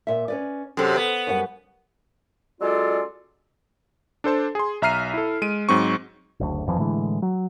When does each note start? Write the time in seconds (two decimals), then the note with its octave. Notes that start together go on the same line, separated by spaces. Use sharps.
0.07 A#2 E5
0.28 C#4 B4 D5
0.77 F#2 C3 A4
0.96 B3
1.27 F#2 G3 F#5
2.61 F#3 G#3 C#4 F4 A4 D5
4.24 D4 A4 C5 A5
4.55 G#4 C6
4.82 B1 E5 A#5 F6 C7 D#7
5.14 E4 A4
5.42 G#3 D7 D#7
5.69 G#2 F#3 C4 C#6
6.40 F#1 D2
6.66 G1 F2 E3 F3
6.78 A2 D3 E3 G#3
7.22 F#3